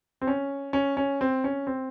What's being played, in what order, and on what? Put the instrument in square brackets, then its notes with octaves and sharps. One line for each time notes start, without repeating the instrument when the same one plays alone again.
[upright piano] C4
C#4
C#4
C#4
C4
C#4
C4